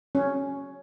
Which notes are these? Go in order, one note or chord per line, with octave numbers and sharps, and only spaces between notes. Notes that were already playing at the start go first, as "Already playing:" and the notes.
C#4